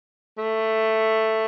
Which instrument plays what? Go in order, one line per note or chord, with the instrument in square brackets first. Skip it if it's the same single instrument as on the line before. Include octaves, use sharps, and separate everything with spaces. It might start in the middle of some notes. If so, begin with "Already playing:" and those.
[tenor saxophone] A3